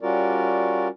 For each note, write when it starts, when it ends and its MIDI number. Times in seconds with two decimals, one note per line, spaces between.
0.01 0.88 55
0.01 0.88 61
0.01 0.88 65
0.01 0.88 66
0.01 0.88 70
0.01 0.88 74